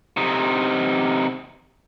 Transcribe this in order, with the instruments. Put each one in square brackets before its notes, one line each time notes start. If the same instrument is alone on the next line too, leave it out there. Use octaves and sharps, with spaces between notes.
[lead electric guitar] C3 D#4